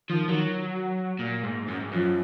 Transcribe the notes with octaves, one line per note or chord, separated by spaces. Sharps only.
D#3 F3
D#3 F#3
A#2
G#2
F#2
G#2
F#2 F3